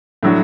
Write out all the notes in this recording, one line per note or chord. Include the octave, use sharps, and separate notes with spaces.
A2 F#3 D4 F#4